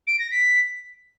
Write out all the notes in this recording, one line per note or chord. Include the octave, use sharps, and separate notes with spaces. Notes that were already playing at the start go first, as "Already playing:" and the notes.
D7
A#6
B6